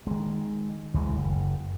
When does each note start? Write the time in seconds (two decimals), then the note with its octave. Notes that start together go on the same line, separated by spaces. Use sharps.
0.07 D#3 G#3
0.94 D2 E3 G#3
1.17 F#1